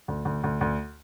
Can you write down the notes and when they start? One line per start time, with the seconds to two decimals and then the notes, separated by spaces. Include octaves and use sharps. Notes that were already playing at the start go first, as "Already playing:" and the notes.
0.08 D2
0.25 D2
0.44 D2
0.61 D2